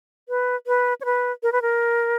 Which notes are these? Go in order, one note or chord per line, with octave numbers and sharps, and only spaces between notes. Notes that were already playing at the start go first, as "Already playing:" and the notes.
B4
B4
C#5
B4
A#4
B4
A#4